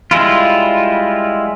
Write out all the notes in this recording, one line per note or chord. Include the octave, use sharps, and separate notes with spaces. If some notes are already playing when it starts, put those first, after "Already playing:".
G3 G#3 E4 F4